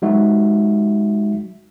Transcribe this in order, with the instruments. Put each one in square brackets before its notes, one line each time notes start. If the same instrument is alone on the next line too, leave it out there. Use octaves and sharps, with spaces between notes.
[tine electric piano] F#3 G#3 D#4 F#4 E5